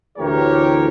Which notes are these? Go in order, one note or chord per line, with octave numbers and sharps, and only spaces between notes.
D2 A2 E3 G4 A#4 C#5